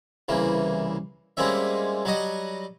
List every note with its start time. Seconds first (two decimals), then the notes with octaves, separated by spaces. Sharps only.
0.29 C2 C#3 E3 A#3
1.37 G3 G#3 A#3 C4 C#4 E5
2.05 F#3 G3 F#4 D#5